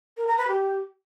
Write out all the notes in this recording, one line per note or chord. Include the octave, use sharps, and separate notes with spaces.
A#4
A#5
B4
G4